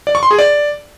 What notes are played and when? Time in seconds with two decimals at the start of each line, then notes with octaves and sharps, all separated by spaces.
0.07 D5
0.15 C#6
0.23 C6
0.31 G#4
0.39 D5